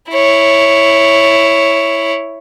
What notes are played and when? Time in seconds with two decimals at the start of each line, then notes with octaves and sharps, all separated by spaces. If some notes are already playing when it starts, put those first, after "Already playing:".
0.10 E4 C#5